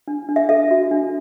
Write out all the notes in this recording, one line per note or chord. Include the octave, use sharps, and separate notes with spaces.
D4
D4
E5
A4 E5
F#4
D4